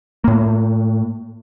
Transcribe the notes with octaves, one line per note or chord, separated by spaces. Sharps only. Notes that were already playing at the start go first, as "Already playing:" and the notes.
A2 A#3